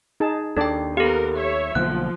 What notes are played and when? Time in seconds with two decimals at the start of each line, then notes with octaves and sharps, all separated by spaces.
0.20 D#4 G#4 A5
0.57 D#2 D4 A4 D5 G5
0.97 B3 G4 A4 A#4 F5
1.36 C#5 E5
1.75 B1 D3 F3 A#3 F#6